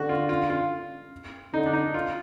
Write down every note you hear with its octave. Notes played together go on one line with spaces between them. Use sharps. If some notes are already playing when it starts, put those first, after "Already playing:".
Already playing: D3 F#4
F4
F4
F4
D3 D#4
D4
D#4
F4